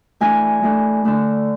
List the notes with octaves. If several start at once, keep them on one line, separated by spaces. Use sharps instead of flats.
E3 A3 D4 G#5
E3 A3 D4
D3 A3 D4